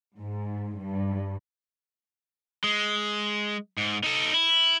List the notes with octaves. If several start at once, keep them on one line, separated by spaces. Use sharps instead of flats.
G#2
G2
G#3
G#2
D#4 A4
E4